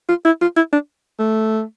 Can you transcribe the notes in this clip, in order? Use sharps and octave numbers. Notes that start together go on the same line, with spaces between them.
F4
E4
F4
E4
D4
A3